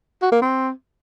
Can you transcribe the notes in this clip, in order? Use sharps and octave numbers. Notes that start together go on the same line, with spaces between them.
F#4
A#3
C4